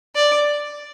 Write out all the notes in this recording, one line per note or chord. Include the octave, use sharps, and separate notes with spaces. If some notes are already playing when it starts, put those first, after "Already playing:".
D5